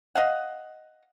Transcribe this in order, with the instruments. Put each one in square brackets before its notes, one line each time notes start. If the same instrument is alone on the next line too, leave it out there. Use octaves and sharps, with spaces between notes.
[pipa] D#5 F5 F#5